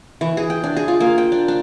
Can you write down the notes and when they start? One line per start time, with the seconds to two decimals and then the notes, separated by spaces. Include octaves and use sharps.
0.21 E3
0.37 G#4
0.50 G5
0.64 D4
0.76 G#4
0.88 F4
1.00 A#3
1.18 G5
1.32 D4
1.48 D4